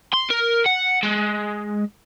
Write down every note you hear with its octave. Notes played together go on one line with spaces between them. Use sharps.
C6
A#4
F#5
G#3